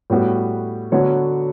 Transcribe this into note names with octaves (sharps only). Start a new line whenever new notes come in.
A2 G3 B3 F#4
D3 F#3 B3 F#4 C#5